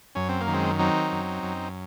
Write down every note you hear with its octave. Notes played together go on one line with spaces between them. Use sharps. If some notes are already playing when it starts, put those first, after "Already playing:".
F#2 C#4
C4
A#3
D#3
G#3 C4
F#3 C4 D#4
F#2
F#2